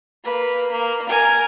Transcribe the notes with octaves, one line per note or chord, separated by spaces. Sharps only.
A#3 B4
A#3
A#4 G#5